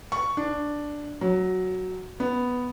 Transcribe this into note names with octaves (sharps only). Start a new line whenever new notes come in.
C#6
D4
F#3
B3